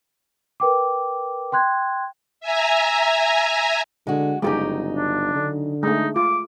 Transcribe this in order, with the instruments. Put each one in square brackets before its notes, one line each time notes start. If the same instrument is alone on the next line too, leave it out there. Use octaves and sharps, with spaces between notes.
[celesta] A#4 B4 G5 D6
G5 C6 F#6 G#6
[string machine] E5 G#5 A#5
[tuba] D3 [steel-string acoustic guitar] G#3 F#4
[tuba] G1 [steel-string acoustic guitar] C#3 F#3 D#4 [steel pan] G#3 G4
[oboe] D4
[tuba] D3
[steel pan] G#3 A3 [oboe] D#4
[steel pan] F4 [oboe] D6